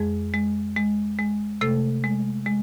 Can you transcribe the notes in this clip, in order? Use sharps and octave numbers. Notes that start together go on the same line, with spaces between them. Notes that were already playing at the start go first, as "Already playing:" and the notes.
Already playing: F2 G#3 G#4
G#3
G#3
G#3
C3 A3 A4
G#3
G#3